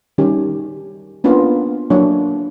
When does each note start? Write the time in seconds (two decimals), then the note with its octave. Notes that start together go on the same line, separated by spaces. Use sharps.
0.18 D#3 G3 C#4 D#4 G4
1.24 A#3 B3 C#4 D4 F4
1.90 F#3 A#3 D4 E4 C#5